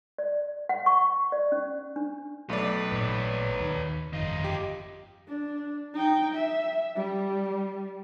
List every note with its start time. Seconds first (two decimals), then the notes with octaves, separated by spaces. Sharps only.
0.18 D5
0.69 F#5
0.86 C#6
1.32 D5
1.52 C#4
1.96 D4
2.50 B1 A3 B4 D5
2.92 A1 A#2 B4 C#5
3.60 D#2 D#3
4.13 G1 F2 D#3 D#4 F4
4.44 G4
5.28 D4
5.94 D#4 G5
6.34 E5
6.95 G3